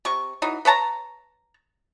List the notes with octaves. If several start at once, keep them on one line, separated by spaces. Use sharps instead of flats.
C3 C#6
E3 F#3 D#4
B4 C#5 A5 A#5